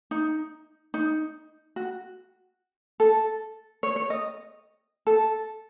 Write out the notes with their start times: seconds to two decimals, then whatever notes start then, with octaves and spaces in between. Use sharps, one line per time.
0.11 D#4
0.94 D#4
1.76 F#4
3.00 A4
3.83 C#5
3.96 C#5
4.10 D#5
5.07 A4